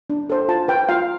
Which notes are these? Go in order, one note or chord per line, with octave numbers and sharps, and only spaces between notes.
D4
A4 C5
F4 A5
B4 G5
F4 F5